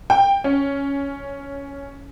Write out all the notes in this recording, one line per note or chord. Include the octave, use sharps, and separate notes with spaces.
G5
C#4